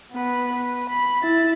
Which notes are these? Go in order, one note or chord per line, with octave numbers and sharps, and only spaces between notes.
B3 B4
B4
B5
E4 A6